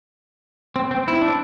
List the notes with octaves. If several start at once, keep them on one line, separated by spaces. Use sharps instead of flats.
C4
C4
E4
D4